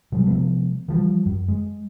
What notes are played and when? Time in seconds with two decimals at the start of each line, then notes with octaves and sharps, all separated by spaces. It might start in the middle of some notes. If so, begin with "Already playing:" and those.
0.12 B2 F#3 G3
0.27 C3 F3 G#3 B3
0.88 E3 F3 G3
1.26 F#2
1.48 G#3